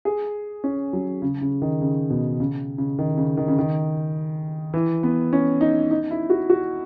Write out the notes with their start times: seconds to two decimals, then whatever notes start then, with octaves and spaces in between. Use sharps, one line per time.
0.05 G#4
0.64 C#4
0.93 F#3
1.22 C#3
1.41 C#3
1.62 D#3
1.81 C#3
2.10 B2
2.40 C#3
2.78 C#3
2.99 D#3
3.17 C#3
3.37 D#3
3.48 C#3
3.59 D#3
4.74 E3
5.03 B3
5.33 C#4
5.61 D#4
5.91 D#4
6.11 E4
6.30 F#4
6.50 F#4